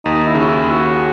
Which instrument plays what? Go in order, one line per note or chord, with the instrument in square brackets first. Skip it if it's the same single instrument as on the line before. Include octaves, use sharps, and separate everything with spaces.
[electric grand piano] D#2 [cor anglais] D#4
[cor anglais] E4
[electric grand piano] C#3 [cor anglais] F#4
[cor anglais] E4
[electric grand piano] D#2
[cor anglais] F#4